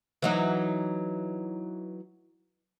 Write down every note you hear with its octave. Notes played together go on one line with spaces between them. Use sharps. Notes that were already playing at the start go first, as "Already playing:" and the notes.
E3 F#3 D#4